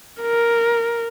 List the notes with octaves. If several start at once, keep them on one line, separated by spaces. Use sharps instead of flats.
A#4